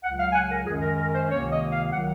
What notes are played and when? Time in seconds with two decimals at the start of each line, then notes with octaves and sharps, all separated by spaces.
0.03 C#2 C#3 F#3 F#5
0.19 F5
0.31 G#5
0.34 F#5
0.51 A#4
0.67 F#2 D#3 G#3 C#4 G#4
0.82 A#4
0.98 A#4
1.13 C5
1.30 C#2 C3 D#3 A#3 C#5
1.50 D#5
1.72 F5
1.92 D#3 F#3 F#5